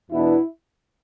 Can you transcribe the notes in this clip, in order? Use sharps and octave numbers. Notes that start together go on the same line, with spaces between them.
E2 B2 B3 D4 E4